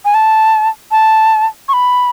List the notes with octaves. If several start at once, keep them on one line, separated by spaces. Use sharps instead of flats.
G#5
A5
A5
C#6
B5